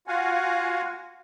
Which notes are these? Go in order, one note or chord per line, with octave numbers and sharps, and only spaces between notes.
F4 F#4 F5 F#5 G#5